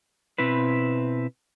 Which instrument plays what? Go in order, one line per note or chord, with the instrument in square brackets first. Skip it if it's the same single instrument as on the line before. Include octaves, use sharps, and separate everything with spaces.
[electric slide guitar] B2 C4 E4 B4